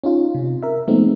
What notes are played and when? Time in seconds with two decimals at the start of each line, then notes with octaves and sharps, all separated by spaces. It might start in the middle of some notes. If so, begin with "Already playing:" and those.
0.04 C#4 D#4 F4
0.35 C3
0.63 A#4 E5
0.88 F3 G#3 A3 B3 C4 D#4